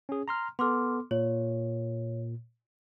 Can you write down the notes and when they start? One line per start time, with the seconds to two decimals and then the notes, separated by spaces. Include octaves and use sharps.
0.09 C#4 G#4
0.28 A#5 C6 F6
0.59 B3 A4 C6 D6 F6
1.11 A#2 C#5